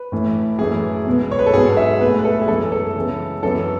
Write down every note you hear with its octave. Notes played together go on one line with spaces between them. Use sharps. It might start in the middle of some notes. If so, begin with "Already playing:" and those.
Already playing: B4
A2 E3 A3
F#2 E3 A3 G#4
B2 G#3 B3
C#5
B4
A4
G#2 F#3 B3 G#4
E5
B2 A3 B4
B4
A4
G#4
F#2 E3 G#3 B3 A4
A4
C#3 E3 G#3 B3
F#2 E3 B3 A4